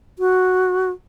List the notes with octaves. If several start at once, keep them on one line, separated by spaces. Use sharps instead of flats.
F#4